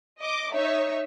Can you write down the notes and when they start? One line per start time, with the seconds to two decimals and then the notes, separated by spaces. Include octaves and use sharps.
0.20 D#5 D6
0.53 D#4 C#5 E5